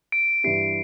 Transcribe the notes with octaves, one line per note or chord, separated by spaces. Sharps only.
D7
G2 E3 G3 E4 G4 C7